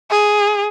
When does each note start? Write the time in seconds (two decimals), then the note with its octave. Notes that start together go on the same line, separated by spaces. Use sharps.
0.11 G#4